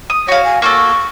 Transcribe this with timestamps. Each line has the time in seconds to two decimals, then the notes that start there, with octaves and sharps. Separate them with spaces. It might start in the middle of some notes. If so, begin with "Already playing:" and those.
0.10 D#6
0.28 F#4 C#5 F5
0.44 G#5
0.62 A#3 F#4 A4 C#6